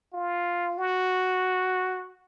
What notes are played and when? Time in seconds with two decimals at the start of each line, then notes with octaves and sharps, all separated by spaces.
0.14 F4
0.78 F#4